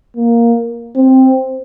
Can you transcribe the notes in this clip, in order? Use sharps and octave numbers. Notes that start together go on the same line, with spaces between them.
A#3
C4